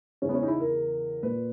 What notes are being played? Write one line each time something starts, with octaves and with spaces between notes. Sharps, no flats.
E2 C#3 E3 C#4
B3
C#4
D#4
E4
A#4
A#2 B4